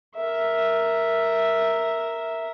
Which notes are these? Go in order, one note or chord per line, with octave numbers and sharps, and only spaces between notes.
A#4 E5